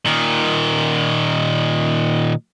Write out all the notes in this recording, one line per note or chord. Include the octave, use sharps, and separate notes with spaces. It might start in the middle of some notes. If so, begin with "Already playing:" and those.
A#2 D#3